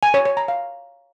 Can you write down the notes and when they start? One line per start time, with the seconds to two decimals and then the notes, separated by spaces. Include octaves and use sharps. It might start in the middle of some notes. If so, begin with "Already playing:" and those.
0.03 G#5
0.14 C#5
0.25 C#5
0.37 A#5
0.48 F5